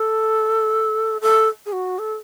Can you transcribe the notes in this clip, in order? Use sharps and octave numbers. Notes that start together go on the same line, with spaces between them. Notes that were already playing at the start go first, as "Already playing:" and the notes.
Already playing: A4
A4
G#4
F#4
A4